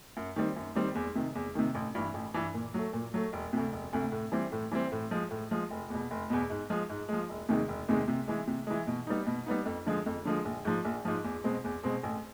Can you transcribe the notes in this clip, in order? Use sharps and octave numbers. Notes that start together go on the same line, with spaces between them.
F#2
D#3 G3 C4
F#2
D#3 G3 C4
E2
C3 D#3
E2
C3 D#3
A1
G2 E3
A1
G2 E3
A#2
F#3 A3
A#2
F#3 A3
E1
D2 C3
E1
D2 C3
A2
E3 G3 C4
A2
E3 G3 C4
A2
F3 G#3
A2
F3 G#3
F1
E2 B2
F1
E2 B2
G#2
F3 G#3
G#2
F3 G#3
E1
E2 C3 D#3 G#3
E1
E2 C3 D#3 G#3
C3
E3 G#3
C3
E3 G#3
B2
G3 B3 D#4
B2
G3 B3 D#4
F2
D3 F3 G#3
F2
D3 F3 G#3
A#1
G#2 F3
A#1
G#2 F3
E2
B2 G#3 C4
E2
B2 G#3 C4
A1